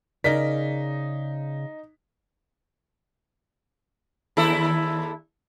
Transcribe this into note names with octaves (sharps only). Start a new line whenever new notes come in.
C#3 D#4 A#4 D5 B6
D#2 E4 A4